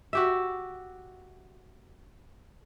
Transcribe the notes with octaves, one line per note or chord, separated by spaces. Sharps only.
F#4 G4 E5